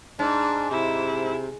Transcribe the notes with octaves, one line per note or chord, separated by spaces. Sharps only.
G#2 D4
C3 E4